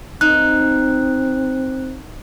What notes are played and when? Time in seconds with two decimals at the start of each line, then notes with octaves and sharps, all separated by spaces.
0.21 C4 D#4 F#6